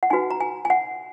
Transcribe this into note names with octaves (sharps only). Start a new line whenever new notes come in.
F#5
D#4 F#4 B4 G#5
A#5
G#5
G#5
F#5